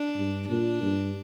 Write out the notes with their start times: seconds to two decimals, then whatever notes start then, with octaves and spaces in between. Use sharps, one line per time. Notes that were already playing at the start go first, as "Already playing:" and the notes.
Already playing: D4
0.16 G2
0.49 A#2 D4
0.83 G2